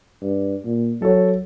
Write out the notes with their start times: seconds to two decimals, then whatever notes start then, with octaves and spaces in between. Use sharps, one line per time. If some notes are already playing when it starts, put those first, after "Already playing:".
0.22 G2
0.65 A#2
1.02 F#3 A4 C#5